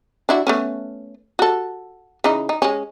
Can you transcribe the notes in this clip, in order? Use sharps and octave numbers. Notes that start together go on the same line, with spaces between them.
D4 E4 F#4
A3 B3 C#4
F#4 A4
C#3 E3 D#4
D#4
G#3 C#4